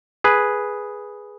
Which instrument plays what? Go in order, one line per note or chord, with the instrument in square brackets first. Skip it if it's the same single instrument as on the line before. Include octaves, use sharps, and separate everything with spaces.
[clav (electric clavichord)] G#4 B4